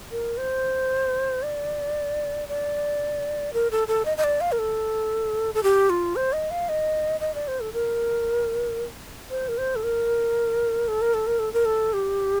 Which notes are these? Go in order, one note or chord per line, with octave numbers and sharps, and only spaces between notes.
A#4
C5
D5
D5
A#4
A4
A4
D#5
D#5
D5
F5
A#4
A4
A4
G4
F4
C5
D#5
F5
D#5
D#5
D5
C5
A4
A#4
C5
A#4
C5
A4
A#4
A4
A#4
A4
A#4
A4
A#4
A4
G4